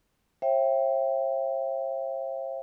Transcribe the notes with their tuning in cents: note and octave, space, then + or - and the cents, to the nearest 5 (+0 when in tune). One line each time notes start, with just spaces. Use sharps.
C5 +45 E5 +20 G5 +0